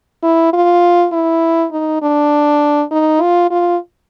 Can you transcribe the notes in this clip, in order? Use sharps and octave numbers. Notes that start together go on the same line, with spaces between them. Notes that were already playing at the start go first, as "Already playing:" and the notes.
E4
F4
E4
D#4
D4
D#4
F4
F4